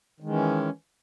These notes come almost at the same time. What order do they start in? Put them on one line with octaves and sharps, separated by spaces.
D#3 G#3 E3 C#4